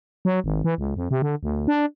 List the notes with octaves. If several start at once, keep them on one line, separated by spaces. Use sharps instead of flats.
F#3
G#1
E3
C#2
F2
C3
D3
D2
D4